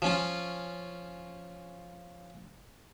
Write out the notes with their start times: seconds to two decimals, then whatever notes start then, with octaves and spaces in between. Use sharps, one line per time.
0.02 F3 C#4 F4